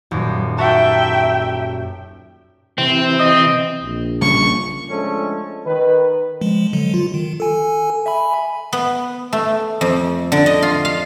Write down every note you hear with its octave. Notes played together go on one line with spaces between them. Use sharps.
D#1 F#2
F#4 E5 G5 A5 A#5
C3 E3 C4
D#5
A#1
C#3 G3 A#3 C#6
F3 G#3 A3 C#4 D4 A4
D#3 B4
F3 G#3
D3 F#3 G#3
F4
D#3
A4 G#5
E5 G#5 B5
B3
A3
F2
D3
D#5
F4
F5